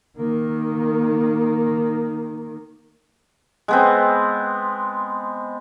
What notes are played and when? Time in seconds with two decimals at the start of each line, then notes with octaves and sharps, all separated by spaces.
0.18 D#3 A#3
3.68 G#3 B3 C4